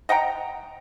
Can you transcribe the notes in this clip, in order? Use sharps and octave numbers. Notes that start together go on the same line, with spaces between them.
D#5 F#5 G5 A#5